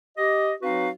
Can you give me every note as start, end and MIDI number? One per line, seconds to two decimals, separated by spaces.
0.18 0.53 67
0.18 0.53 75
0.62 0.88 54
0.62 0.88 60
0.62 0.88 63
0.62 0.88 66
0.62 0.88 71
0.62 0.88 77